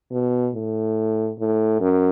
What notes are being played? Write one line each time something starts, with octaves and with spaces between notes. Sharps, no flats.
B2
A2
A2
F#2